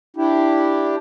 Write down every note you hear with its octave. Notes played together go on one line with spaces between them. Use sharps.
D4 E4 G4